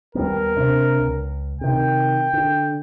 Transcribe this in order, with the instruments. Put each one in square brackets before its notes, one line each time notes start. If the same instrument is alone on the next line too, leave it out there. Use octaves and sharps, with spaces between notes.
[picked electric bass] D#2 G3 B3 [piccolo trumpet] A#4
[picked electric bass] C3 C4 D4
C#2
[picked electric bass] C3 D#3 [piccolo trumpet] G5
[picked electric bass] D3